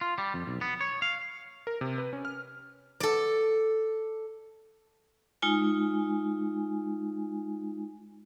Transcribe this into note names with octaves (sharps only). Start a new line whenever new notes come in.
F4
G3
F2
B1
B3
C#5
F5
A#4
C3
B4
C#4
F6
A4 D5
G#3 D#4 F4 G#5